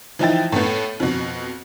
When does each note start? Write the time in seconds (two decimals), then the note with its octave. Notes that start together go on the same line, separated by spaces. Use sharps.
0.19 E3 F3 D#4 E4 G5 A6
0.52 A2 A3 B3
1.00 F2 B2